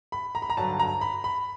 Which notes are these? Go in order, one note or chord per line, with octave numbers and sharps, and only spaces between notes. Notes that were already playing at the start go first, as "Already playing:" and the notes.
B5
A#5
B5
A#5
G2 D3 F#3 A5
A#5
B5
B5